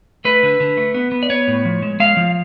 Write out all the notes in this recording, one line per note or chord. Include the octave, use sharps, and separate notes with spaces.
A3 B4
D3
D3
A3
B3
B3
D5
B3 C#5
A2
F3
G#3
G#3 F5
F3